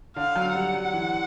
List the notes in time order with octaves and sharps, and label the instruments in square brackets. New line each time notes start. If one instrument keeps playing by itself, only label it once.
[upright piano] D3 [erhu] F5
[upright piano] F#3
[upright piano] G3 [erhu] F#5
[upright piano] F#3
E3